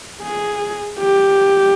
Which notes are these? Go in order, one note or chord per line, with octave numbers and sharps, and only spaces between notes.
G#4
G4